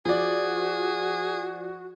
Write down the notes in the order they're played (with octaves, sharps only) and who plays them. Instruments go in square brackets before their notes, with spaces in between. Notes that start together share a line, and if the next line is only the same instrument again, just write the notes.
[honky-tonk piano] F3 D5 [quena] F#4 [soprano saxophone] G#4